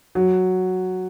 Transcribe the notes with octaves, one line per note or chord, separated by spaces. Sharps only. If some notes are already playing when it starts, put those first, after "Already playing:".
F#3